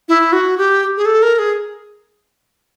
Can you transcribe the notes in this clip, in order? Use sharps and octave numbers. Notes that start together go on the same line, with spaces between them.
E4
F#4
G4
G#4
A4
A#4
G#4